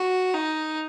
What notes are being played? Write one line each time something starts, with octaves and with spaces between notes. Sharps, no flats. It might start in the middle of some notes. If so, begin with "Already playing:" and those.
Already playing: F#4
D#4